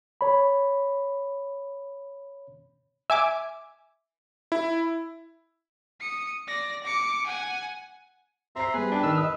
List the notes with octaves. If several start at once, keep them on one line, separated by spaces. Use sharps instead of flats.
C#5 B5
E5 G#5 D6
E4
D#6 C#7
D5 A#6
D6 C#7
F#5 G#5
C4 C5 E5 A#5 C6 C7
G3 B3 G#4 B4
D4 G5
D#3 E6 F6
D#5 D#6